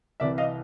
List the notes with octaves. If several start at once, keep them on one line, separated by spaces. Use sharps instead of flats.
C2 C3 E3 D5 E5
D#5 F5